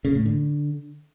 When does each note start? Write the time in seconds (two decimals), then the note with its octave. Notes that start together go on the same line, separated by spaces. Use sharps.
0.05 C#3
0.15 A2
0.26 D3